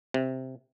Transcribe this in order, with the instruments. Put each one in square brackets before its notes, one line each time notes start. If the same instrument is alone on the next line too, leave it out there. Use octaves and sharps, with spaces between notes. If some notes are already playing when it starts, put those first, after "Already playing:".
[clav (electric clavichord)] C3